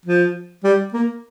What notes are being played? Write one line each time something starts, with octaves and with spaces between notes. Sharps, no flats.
F3
G3
A#3